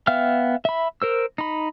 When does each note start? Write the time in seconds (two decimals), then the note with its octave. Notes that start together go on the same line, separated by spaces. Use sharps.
0.07 B3 E5 F5 G5 F6
0.65 E5 B5
1.02 A#4 C5 E6
1.38 D#4 B5